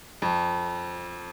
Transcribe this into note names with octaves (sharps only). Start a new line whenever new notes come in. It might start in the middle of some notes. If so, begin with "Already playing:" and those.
F2